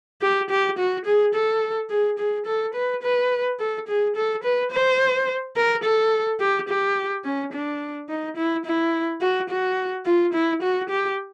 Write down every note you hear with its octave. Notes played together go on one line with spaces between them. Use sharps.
G4
G4
F#4
G#4
A4
G#4
G#4
A4
B4
B4
A4
G#4
A4
B4
C5
A#4
A4
G4
G4
C#4
D4
D#4
E4
E4
F#4
F#4
F4
E4
F#4
G4